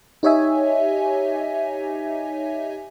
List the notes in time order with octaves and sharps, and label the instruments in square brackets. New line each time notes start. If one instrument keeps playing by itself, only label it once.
[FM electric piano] D#4 G4 C#5 D#5 E5 G#5